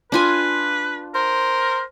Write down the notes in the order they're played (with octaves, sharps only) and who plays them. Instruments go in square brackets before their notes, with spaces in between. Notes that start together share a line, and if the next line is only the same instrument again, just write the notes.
[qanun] D4 F4 G#5 [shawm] B4
[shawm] A#4 [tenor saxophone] C5